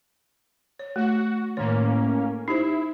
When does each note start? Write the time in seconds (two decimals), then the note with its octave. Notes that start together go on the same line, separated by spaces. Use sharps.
0.79 C#5
0.96 A3 F#4
1.57 A2 D#3 A#3 C#4 C#5
2.48 D#4 E4 G4 C5